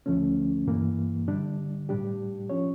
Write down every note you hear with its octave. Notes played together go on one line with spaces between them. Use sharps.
D2 D3 F3 A3 C#4
G2 E3 A#3
D3 G3 D4
A2 G3 D4 G4
F3 C#4 F4 C#5